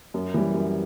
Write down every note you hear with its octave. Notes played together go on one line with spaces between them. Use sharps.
F#2
E3 G3
F#2